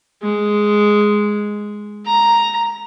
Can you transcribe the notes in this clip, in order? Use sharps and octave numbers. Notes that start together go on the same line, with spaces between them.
G#3
A#5